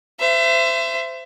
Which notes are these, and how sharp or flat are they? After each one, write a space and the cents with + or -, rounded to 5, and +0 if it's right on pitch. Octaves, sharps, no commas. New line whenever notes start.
C5 -25 E5 +25